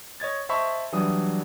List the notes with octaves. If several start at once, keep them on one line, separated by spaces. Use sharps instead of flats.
C#5 D#5 G#6 A6
C5 D#5 E5 A5 B5 C#6
E3 F#3 G3 D4 D#6